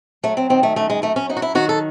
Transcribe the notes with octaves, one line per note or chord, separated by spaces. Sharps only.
F#3 A3
C4
D#3 C4
A3
F#2 A3
G#3
F#2 A3
C#4
F#3 D#4
F#4
E4
D#3 F#4
A4